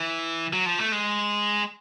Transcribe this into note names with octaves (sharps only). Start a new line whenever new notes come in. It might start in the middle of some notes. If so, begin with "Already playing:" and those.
Already playing: E3
F#3
F3
A3
G#3